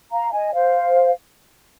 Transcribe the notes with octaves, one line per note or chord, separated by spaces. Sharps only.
F5 A#5
D#5 G#5
C5 F5